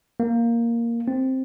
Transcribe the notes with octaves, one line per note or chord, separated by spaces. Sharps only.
A#3
C4